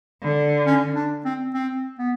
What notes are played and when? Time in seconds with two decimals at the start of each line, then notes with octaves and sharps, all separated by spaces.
0.22 D3
0.67 C#4
0.95 D4
1.25 C4
1.54 C4
1.99 B3